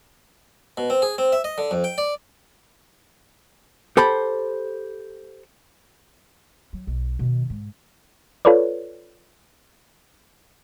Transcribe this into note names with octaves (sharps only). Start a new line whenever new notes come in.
B2
C4
G#4
C4
E5
D#5
D3
F2
G5
D5
G4 A4 C5 B5
F#3
B1
B2 D#3
G#2
F4 A4 B4 C#5 D5